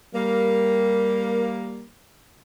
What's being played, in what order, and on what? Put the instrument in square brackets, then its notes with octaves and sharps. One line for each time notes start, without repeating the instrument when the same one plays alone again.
[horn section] G3 A#3